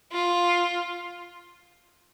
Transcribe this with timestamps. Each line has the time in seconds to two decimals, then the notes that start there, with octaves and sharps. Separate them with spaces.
0.12 F4